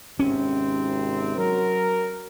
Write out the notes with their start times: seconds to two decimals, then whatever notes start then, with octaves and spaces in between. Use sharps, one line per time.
0.19 G#1 C3 C4 C#4
1.37 F#3 A#4